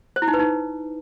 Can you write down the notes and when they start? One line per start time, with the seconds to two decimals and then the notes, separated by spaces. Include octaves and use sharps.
0.16 C5
0.22 E4
0.28 D#4
0.34 B4
0.39 D#4